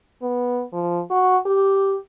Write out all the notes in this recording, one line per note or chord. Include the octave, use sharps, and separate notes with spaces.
B3
F3
F#4
G4